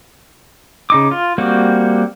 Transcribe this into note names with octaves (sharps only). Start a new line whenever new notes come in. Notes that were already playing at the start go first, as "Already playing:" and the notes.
C#3 D#4 D6
F4
G3 A#3 C4 F#4